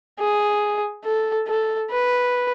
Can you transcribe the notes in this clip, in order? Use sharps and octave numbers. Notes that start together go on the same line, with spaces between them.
G#4
A4
A4
B4